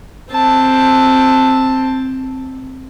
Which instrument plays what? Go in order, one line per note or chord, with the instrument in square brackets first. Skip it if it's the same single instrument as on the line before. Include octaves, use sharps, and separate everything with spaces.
[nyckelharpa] C4 A5